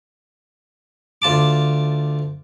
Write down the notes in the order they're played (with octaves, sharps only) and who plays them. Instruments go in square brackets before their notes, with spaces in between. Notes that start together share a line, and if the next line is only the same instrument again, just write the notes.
[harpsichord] D2 F4 A5 D6